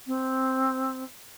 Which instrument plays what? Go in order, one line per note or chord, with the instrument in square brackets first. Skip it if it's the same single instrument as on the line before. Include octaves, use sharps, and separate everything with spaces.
[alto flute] C4